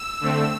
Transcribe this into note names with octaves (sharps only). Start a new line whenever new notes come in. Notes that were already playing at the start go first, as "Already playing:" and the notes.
Already playing: E6
D3 A3 C4